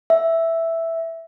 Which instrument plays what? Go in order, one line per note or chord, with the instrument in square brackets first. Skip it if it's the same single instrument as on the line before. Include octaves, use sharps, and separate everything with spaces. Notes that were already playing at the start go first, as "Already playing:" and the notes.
[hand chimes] E5